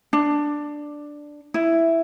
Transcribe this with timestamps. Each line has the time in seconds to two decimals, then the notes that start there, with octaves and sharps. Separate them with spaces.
0.13 D4
1.54 E4